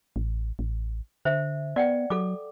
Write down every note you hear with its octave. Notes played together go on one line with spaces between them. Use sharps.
A1
A1
D3 C5 E5
B3 D5 F#5 G5
F#3 A4 D6